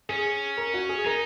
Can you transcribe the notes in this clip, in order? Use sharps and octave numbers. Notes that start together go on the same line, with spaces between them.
C#4 G#4
A#4
F#4
G#4
D#4 A#4